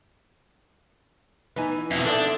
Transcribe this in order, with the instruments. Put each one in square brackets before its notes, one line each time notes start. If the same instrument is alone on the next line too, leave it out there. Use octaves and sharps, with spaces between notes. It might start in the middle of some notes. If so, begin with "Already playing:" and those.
[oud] E3 D#4 [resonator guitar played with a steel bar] B3 G#5
[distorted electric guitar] F2 B2 [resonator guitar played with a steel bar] E4
[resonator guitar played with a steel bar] E2 C4 E5 [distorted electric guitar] D4 [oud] A4 D5